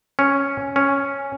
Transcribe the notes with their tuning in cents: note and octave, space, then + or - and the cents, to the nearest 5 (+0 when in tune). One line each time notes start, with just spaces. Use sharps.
C#4 +0
C#4 +0